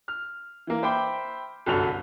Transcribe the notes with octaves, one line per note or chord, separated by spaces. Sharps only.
F6
E3 A#3
C5 E5 G5 B5 D6
G1 C2 F#2 F#3 A4 F7